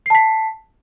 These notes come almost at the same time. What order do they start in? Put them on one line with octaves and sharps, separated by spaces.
C7 A5 B6